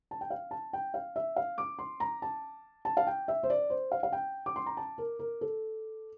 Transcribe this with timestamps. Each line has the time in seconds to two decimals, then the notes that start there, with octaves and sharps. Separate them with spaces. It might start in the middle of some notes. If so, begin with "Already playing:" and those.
0.11 A5
0.21 G5
0.30 F5
0.51 A5
0.73 G5
0.94 F5
1.16 E5
1.36 F5
1.58 D6
1.79 C6
2.00 A#5
2.22 A5
2.85 A5
2.97 F5
3.07 G5
3.28 E5
3.43 C5
3.50 D5
3.70 C5
3.92 F5
4.03 F5
4.12 G5
4.46 D6
4.56 C6
4.66 A#5
4.77 A5
4.98 A#4
5.19 A#4
5.41 A4